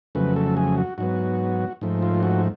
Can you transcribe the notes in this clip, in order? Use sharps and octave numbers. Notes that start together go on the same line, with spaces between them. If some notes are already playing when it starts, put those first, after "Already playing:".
F2 C#3 F#3 A3 B4
A4
G#4
F#4
G#2 F#3 B3 F#4
G#2 F3 A3
F4
F#4